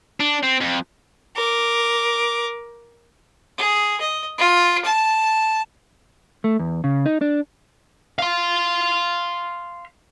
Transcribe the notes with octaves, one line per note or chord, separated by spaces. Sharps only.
D4
C4
F2
A#4 D6
G#4
D#5
F4
A5
A3
E2
C#3
D#4
D4
F5 C6